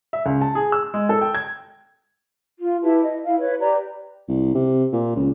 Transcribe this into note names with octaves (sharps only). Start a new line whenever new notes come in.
E5
C#2
A5
G#4
E6
G#3
A4
G5
G#6
F4
E4 G4 B4 A5
D#5
E4 F5
B4 C#5
G4 B4 D5 A#5
C2
C3
A#2
C#2